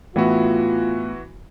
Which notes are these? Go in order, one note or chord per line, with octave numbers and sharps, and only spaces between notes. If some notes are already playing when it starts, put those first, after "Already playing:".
A2 E3 B3 F4 F#4 E5